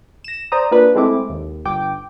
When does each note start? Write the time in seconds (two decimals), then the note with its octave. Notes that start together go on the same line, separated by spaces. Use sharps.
0.24 A#6 E7
0.52 C5 D5 A#5 D#6
0.71 A#3 D4 F4 A#4 B4
0.95 G#3 A3 C4 E4 D6
1.29 D#2
1.65 G1 G5 D6